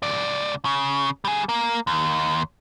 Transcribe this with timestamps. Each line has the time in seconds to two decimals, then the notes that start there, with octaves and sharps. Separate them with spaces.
0.02 C#2 D5
0.65 C#3
1.25 G3 G#4
1.49 A#3
1.87 D#2